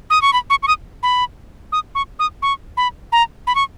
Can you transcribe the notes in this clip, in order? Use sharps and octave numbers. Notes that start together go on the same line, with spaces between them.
D#6
C#6
B5
C#6
C#6
D#6
B5
D#6
C#6
D#6
C#6
B5
A#5
B5
C#6